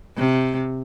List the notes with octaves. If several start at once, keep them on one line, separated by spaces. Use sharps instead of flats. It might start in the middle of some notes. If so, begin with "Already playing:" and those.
C3